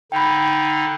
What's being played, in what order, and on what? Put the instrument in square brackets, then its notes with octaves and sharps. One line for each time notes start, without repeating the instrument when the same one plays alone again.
[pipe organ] D3 D#4 [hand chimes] G5 B5